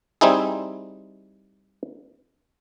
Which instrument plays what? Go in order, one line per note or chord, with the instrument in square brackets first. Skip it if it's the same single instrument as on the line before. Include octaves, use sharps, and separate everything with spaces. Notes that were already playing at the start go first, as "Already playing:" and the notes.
[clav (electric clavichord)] G3 C4 D#4 E4 G#4